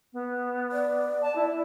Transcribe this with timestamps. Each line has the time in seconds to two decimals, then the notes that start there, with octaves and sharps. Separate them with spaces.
0.13 B3
0.72 D5
1.22 A5
1.36 E4